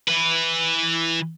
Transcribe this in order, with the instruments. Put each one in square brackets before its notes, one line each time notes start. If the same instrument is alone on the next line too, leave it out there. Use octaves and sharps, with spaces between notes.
[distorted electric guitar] E3 B4